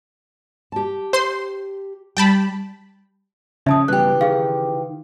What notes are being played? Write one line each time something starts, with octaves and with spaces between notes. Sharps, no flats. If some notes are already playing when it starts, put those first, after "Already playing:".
G4 A5
C5 C6
G3 G5 A5 B5
F2 C#3 C#4 E5 A5 D#6
G2 B2 E3 G4 F#6
D#3 G#4 F5